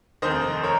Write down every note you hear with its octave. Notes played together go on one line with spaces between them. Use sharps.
F1 D#2 D#3 C5 D#5
A#4 C#5